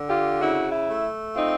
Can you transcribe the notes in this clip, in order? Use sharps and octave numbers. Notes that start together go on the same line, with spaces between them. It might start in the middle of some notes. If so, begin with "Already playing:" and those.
Already playing: D3
F4 G4
C#3 E4 F#4
E4
A3
C4 D#4 F4